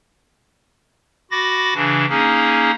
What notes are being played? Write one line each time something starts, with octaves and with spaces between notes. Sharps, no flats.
F#4 B5 D6 A6 A#6
C#3 E3 D4
A#3 C#4 D#4 G#4